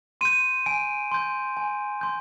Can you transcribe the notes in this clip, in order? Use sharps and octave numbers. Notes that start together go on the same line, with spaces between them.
C6 G6 D#7
G#5 D7
C6 G6
G#5
C6 G6